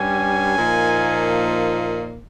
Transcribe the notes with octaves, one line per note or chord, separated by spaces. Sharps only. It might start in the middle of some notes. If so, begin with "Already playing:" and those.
Already playing: G2 G3 C#4 G#5
A#2 F3 A#3 D#4